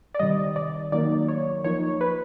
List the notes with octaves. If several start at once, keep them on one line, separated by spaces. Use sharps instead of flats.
D5
C3 D#3 G3 D#5
D5
D#3 F#3 A#3 D#4 D5
C#5
F3 A#3 D#4 C#5
B4